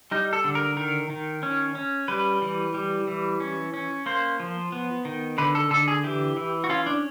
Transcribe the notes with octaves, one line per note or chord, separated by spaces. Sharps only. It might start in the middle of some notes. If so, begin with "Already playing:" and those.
G3 D#4
A4
D3
A#4
D#3 A#4
D#3
C#4
C#4
G3 B4
E3
G3
E3
C#4
C#4
A#3 C5
F3
B3
D#3
D3 B4
A4
D3 A4
G#4
E3 G4
E3
F#4
C#4 F4
D4